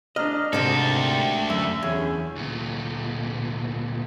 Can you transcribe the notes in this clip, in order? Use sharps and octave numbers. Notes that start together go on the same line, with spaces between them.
D4 D#5 A#5 F6
D2 G#2 C3 D#3 A4
G5
F#2 E5
E2 C#4 G#4
D2 A#2